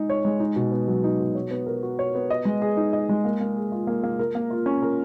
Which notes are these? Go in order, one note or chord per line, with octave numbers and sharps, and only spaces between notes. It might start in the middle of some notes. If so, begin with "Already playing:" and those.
Already playing: G#3 D#4
C#5
G#3
D#4
B2
B3
F#3
D#4
B2
C#5
B3
A#4
F#4
C#5
B3
D#5
G#3
G#4
D#4
D#5
G#3
A#3
A#3
G#4
F4
A#3
A#3
A#4
A#3
F4
C#4
A#4